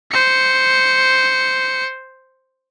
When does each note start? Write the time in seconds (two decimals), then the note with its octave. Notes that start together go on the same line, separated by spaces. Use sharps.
0.11 C5 C#7